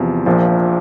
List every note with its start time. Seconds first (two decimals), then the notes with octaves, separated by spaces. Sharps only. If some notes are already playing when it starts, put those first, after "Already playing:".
Already playing: E2 C3 F3
0.26 A#1 A#2 F3